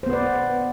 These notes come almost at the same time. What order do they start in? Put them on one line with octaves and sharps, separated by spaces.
C5 B3 B4 D5